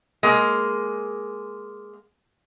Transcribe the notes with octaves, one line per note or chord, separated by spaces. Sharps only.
G#3 A#3